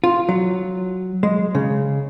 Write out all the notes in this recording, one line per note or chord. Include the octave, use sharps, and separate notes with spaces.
F4
F#3
G#3
C#3